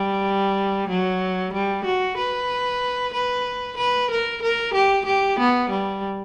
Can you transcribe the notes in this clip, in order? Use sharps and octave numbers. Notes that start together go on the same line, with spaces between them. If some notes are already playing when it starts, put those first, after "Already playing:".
Already playing: G3
F#3
G3
F#4
B4
B4
B4
A#4
A#4
G4
G4
B3
G3